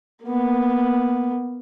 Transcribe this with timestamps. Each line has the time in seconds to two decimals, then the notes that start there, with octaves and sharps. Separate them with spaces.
0.24 A#3 B3